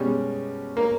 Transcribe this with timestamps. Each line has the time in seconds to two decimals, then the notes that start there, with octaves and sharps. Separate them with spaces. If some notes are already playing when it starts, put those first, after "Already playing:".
Already playing: B2 G3 G#3 C#4
0.77 A#3